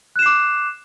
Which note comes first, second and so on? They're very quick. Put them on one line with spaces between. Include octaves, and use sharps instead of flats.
F#6 E7 C7 D6